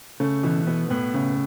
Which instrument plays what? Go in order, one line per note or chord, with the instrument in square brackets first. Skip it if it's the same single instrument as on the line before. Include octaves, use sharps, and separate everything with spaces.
[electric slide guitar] C#3 [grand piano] A3
[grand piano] B2 [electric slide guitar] E3
[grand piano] B2 [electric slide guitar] B3
[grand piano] A2 [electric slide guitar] B3
[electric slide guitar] C#3